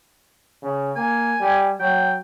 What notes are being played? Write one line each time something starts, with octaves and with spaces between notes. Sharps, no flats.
C#3
A#3 G#5
G3
F#3 G5